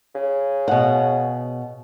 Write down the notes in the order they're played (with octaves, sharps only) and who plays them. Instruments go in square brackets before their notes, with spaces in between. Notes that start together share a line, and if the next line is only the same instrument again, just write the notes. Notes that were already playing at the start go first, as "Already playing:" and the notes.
[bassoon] C#3
[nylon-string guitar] B2 F#5